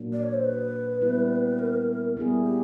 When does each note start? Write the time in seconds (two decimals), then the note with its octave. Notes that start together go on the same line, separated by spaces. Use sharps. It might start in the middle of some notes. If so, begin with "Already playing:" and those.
Already playing: A#2 F#3 A#3 D4
0.13 D5
0.23 C#5
0.34 C5
0.45 B4
1.01 G3 B3 E4
1.59 A#4
2.17 G3 B3 E4 G#4
2.45 G4